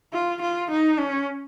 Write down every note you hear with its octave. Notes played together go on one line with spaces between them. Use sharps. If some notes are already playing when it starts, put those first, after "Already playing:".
F4
F4
D#4
C#4